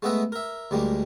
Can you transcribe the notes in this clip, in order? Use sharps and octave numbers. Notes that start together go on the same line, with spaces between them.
G#3 A3 B3 D#5 E5 F#5
A#4 E5
D2 G3 G#3 A#3